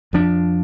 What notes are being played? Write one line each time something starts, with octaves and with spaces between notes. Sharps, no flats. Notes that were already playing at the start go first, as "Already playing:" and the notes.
F2 F3 D4